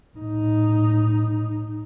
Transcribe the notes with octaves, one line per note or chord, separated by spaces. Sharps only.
A2 D#4